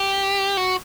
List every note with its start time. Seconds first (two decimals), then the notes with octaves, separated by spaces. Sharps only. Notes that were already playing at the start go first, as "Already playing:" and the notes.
Already playing: G4
0.57 F#4